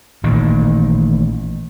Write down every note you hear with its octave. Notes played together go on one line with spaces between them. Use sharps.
A1 A#2 D#3